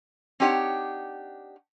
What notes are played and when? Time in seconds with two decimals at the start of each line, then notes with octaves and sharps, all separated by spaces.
0.40 C4 D4 D#4 G4 C#5 F#5